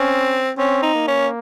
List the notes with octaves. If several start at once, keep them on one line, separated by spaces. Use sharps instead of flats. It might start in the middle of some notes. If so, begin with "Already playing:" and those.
Already playing: C4 C#4
C4 C#4
D#4
A#3
C#4